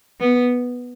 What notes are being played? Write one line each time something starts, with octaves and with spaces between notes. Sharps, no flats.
B3